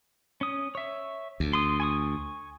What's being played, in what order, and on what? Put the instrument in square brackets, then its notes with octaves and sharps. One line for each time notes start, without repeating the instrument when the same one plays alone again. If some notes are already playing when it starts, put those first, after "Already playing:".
[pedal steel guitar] C#4 D#6
C#5 E5
[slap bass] D2
[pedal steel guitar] C6 D#6
G#5 C#6 D#6